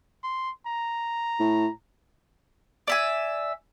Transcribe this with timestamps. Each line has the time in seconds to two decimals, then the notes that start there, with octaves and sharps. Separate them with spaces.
0.24 C6
0.67 A#5
1.39 A2
2.88 D5 E5 G#5